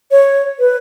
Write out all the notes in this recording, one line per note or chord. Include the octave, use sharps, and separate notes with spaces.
C#5
B4